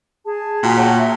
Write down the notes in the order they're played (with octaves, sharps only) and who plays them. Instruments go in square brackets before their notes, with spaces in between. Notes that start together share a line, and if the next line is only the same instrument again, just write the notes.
[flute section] G#4 A5
[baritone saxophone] A#2 [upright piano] F#4
[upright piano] C#5 F#5 G5
[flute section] E5